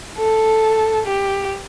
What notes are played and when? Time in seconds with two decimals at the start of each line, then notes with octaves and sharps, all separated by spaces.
0.18 A4
1.06 G4